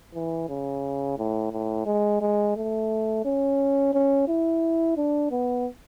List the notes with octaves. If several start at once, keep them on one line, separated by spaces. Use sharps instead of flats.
E3
C#3
A2
A2
G#3
G#3
A3
C#4
C#4
E4
D4
B3